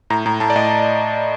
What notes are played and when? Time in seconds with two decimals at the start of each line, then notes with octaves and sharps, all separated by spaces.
0.10 A2 A#5
0.26 A2 A#5
0.40 A2 A5
0.50 D5
0.56 A2 D#5